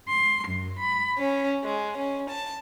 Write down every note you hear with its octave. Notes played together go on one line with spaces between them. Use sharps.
C6
F#2
B5
C#4
G#3
C#4
A5